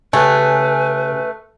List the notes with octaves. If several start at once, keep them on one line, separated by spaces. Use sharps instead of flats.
C#3 A3 G4 B4 G#5 F#6